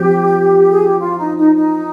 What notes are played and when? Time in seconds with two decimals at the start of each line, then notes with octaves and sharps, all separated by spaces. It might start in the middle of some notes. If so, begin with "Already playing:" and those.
Already playing: F3 C4 G4
0.71 G#4
0.81 G4
1.00 F4
1.18 D#4
1.37 D#4
1.55 D#4